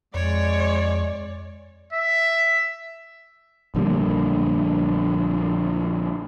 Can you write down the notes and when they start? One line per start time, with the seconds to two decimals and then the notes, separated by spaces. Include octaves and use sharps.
0.14 F2 G#3 C#5 D5
1.93 E5
3.75 A#1 D3 G3 A#3